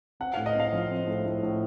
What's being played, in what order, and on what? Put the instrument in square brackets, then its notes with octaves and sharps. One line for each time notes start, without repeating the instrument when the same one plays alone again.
[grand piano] C4 [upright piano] F#5
[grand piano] A2 [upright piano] F5
[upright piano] D#5
[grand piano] C4 [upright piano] F5
[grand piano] F3
C4
A2
A2
A2